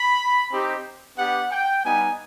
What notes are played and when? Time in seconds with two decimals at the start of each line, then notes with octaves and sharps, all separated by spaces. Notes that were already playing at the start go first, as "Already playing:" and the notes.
Already playing: B5
0.52 C4 D#4 G4
1.17 B3 D4 G4 F#5
1.51 G5
1.84 G3 B3 D#4 G#5